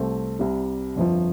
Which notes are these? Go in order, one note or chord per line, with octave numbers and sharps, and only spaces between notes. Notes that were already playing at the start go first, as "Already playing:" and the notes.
Already playing: C2 C3 A3 C4
C2 C3 G3
G1 F2 F3